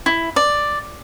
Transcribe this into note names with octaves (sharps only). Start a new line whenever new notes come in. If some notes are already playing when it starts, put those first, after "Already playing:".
E4
D5